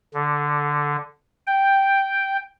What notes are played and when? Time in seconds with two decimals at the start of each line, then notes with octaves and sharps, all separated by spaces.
0.14 D3
1.47 G5